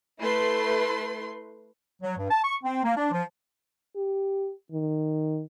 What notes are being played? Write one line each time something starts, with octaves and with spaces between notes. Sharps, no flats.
A3 E4 B4 C6
F#3
G2
A5
C#6
C4
A#3
D4
F3
G4
D#3